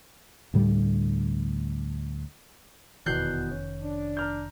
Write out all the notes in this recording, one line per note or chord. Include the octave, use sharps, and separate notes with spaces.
D2 A2 G3
F1 E2 B2 D#3 F#6 G6 C7
C#4
D4
A#5 F6 G6